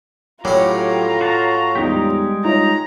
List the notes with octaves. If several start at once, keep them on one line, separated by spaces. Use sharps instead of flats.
A2 F#3 C#4 F4 G4 A#5
F#4 F5 A5
E2 G3 G#3 D#4 G4
D#4 F4 C#5 A#5